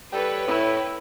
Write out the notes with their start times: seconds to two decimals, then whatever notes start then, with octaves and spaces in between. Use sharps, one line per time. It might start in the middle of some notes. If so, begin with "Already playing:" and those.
0.13 G3 A4 B4 C#5 G5
0.47 A2 E4